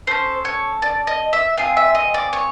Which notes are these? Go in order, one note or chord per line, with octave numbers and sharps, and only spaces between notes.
C#4 F#4 A4 C5
C#5
D5
D#5
E5
C4 F4 G#4 F5
E5
D#5
D5
C#5